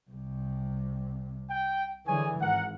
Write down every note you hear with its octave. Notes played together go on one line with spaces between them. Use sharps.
C2 C3
G5
D3 E3 G#4 C#5 G#5
G#1 A#4 F#5